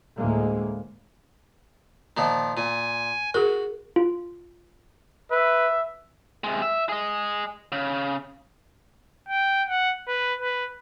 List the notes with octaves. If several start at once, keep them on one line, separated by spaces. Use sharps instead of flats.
D2 A2 G#3 A#3
A#2 D#3 F3
A#2 G#5
F#4 G#4 A#4
F4
B4 E5
C3 G#3
E5
G#4 D#5
C#3
G5
F#5
B4
B4